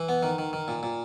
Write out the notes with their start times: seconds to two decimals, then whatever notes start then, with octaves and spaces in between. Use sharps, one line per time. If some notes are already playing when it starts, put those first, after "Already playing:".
Already playing: E3
0.09 B3
0.23 D#3
0.38 D#3
0.53 D#3
0.68 A#2
0.83 A#2